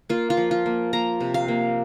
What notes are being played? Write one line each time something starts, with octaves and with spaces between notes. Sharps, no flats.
A#3 F4
F4
F3
F4
A#3
A#3 A#5
C3
F5
A#3